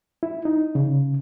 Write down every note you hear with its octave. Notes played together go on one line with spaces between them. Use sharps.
E4
D#4
C#3